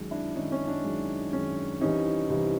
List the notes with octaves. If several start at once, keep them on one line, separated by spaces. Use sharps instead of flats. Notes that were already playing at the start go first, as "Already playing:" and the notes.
Already playing: F#2 D#3 G#3
D4 E4
F#2 D#3 G#3 C#4 D#4
C#4
D4
F#2 D#3 G#3
F#2 D#3 G#3 C#4
C2 C3 E3 G3 C#4 D#4
C2 C3 E3 G3